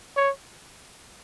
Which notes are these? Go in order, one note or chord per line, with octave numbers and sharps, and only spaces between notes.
C#5